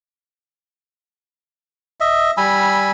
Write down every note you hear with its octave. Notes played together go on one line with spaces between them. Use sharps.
D#5 E5
G3 G#5 B5 E6